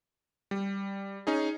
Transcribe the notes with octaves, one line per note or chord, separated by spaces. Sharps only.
G3
C#4 D#4 G#4